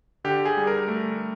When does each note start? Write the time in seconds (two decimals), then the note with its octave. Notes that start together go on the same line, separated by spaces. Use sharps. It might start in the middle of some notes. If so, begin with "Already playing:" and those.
0.24 D3 G4
0.45 G#4
0.57 G3
0.67 A#4
0.88 A3